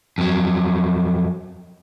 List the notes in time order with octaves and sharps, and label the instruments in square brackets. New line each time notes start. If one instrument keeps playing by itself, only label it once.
[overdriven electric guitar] F2 F#3